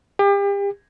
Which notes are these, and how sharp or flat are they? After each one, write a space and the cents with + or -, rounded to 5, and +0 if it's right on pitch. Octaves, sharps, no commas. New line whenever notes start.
G4 +35